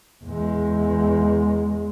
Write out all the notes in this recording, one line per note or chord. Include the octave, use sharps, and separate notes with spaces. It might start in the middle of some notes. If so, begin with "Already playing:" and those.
E2 G#3